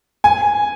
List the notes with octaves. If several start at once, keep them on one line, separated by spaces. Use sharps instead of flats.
G#5